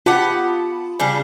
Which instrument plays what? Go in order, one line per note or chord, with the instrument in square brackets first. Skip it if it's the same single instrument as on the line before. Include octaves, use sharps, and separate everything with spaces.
[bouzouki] B3 G4 F#5 [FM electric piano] F4 A5 B5
[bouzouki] C#3 G3 D4